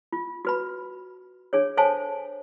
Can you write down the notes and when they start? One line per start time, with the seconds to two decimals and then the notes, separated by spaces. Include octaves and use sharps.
0.13 F4
0.45 F#4 B4 B5
1.53 D4 G#4 C#5
1.77 A4 C5 C#5 F5 G#5 A5